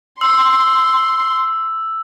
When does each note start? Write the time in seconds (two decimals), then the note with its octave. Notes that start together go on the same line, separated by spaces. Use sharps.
0.21 C6 E6